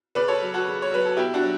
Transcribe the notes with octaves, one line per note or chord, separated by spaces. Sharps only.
C#3 B4 D5
A4 C#5
F#3
F#4 A4
C#3
C#5
F#3 B4
A4
B2 E4 G4
D4 F#4
F#3